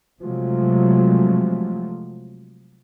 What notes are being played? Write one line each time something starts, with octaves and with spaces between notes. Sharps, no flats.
C3 F3 F#3 G#3 A3